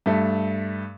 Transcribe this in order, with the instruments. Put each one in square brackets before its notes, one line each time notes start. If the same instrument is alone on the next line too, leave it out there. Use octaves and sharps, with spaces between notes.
[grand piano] G2 A3